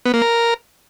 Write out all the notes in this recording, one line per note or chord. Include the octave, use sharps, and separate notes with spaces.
B3
A#3
A#4